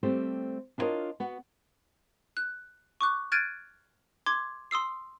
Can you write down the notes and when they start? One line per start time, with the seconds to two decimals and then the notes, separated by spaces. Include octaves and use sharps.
0.03 G3 A3 C4 G4 A4 C5
0.78 D4 E4 F4 A#4 C#5 D#5
1.20 B3 F#4
2.37 F#6
3.01 C#6 D6 F#6
3.32 F6 F#6 G#6 A6 D7 D#7
4.26 C6 D6 G#6
4.71 C6 D#6 E6 C7